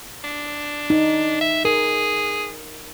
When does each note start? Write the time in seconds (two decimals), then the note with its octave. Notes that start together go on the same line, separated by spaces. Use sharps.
0.24 D4
0.90 D#4
1.41 E5
1.65 G#4 A#4